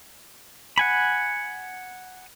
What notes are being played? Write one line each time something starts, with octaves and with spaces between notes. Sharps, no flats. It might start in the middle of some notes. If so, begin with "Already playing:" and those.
F#5 G#5 B5